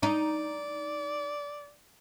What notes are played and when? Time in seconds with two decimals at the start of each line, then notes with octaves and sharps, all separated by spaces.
0.03 D#4 D5